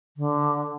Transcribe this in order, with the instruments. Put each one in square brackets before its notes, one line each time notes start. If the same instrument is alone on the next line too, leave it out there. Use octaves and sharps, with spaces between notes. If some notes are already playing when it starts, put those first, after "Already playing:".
[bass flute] D3